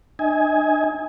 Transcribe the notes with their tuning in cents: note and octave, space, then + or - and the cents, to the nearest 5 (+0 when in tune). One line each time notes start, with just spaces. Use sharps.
D4 +40 D#5 +30 G#5 +0